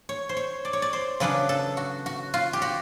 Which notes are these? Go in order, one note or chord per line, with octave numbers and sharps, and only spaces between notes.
C#5
C5
C#5
D5
C#5
D5
C5
C#3 F#3 B3 D4 B4
A4
F#4
F#4
F4
G4
F#4